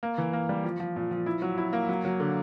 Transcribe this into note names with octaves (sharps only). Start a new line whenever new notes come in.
A#3
E3
A#3
G3
F3
F3
A#2
F3
E4
F#3
E4
A#3
F#3
F#3
D3